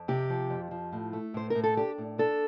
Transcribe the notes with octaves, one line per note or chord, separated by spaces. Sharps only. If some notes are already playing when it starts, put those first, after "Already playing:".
Already playing: F2
C3 G4
F3
F2
F3
A2
A3
A2 C5
A2 A#4
A4
D4 G4
A2
D4 A4